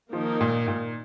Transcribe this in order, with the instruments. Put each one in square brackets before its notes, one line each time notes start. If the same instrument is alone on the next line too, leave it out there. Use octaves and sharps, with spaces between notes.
[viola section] D#3 A#3 D#4 A#4 [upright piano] F3
[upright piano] A#2
A#2